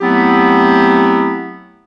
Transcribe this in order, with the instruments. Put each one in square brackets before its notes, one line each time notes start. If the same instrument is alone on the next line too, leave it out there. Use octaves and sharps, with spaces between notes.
[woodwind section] F#3 A3 B3 C4 E4 G4